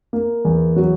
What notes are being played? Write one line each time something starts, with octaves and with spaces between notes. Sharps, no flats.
A#3
E2
F#3